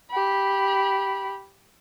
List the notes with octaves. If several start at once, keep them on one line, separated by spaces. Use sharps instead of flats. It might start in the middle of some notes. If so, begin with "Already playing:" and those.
G4 B5